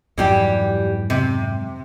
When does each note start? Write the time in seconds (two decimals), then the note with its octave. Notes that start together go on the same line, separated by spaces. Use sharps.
0.18 F2 G#2 E3 F#3 G3 G4
1.10 C3